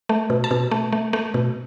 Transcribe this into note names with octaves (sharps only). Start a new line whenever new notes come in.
A3
B2
A5
B2
A3
A3
A3
B2